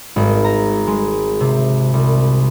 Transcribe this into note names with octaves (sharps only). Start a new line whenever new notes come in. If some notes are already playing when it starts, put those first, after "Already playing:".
G#1
A#5
G#3
C3
C2